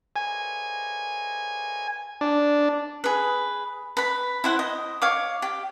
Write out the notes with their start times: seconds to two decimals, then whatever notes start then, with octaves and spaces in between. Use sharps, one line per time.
0.16 G#5
2.21 D4
3.04 G#4 B4
3.97 B4 B5
4.44 E4 C5 F#5
4.59 D#5
5.02 C#5 F5 D6
5.42 G4